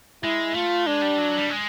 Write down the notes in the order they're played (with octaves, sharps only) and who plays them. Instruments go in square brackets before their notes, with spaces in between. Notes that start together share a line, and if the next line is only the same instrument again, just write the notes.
[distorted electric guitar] G#3 [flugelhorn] E4
[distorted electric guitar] A3 [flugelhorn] F4
[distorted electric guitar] G#3 [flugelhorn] D4
[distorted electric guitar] G3
F#3
G3
G#3